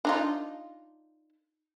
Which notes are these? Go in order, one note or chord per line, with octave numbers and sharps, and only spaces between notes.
D4 D#4 F4